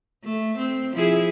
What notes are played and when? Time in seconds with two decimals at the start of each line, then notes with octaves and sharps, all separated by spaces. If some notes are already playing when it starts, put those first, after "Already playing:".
0.24 A3
0.58 C4
0.93 F3 E4 G#4